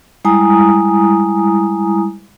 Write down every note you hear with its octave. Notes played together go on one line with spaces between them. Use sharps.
G3 G#3 E4 G#5 A#5 D#6